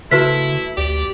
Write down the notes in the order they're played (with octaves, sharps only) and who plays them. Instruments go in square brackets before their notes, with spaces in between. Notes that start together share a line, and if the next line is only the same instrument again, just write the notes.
[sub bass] C#3 [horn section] A3 E4 [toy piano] F#4 B4 C5 [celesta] B6
[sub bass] D2 [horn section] G4 D5